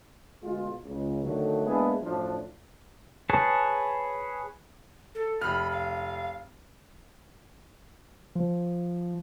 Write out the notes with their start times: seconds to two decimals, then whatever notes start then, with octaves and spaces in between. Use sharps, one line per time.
0.43 D2 B2 G#3 F4
0.84 C#2
1.24 D3 D#3 F#3 A3
1.66 G#3 A#3 B3 D4 E4 G#4
2.03 F#2 A2 F3 D4
3.30 G#4 B4 C#5 A5
5.15 A4
5.41 F1 B5 F6
5.71 F5
8.35 F3